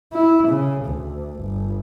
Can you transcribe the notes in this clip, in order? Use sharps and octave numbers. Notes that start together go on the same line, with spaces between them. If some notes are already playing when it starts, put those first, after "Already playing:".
E4
C#3
D2
G1